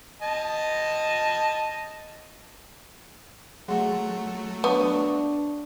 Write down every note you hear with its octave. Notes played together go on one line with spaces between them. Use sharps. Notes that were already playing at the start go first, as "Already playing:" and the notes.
D#5 A5
F#3 A3 G#4 F#5 C6
B3 D4 C#5 A5 C#6